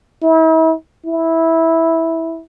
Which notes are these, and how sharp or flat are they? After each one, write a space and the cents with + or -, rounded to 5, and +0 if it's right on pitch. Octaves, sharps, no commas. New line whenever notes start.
E4 -40
E4 -10